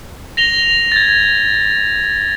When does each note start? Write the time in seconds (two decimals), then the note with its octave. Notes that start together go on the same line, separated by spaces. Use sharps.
0.37 A#6 F7 G7
0.92 G#6 A6